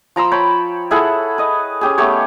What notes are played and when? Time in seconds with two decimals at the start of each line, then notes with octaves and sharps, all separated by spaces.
0.16 F3 A#5 C6 E6
0.32 C#5 G5 A5 B5
0.91 E4 G#4 A4 F#5
1.38 B4 D#5
1.81 C#4 G4 G#4
1.98 A3 B3 G4 C#5